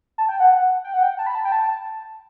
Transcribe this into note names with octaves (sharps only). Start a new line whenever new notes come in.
A5
G5
F#5
F#5
G5
F#5
G5
A5
B5
A5
G5
A5